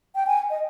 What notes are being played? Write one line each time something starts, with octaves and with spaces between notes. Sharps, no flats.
G5
G#5
D#5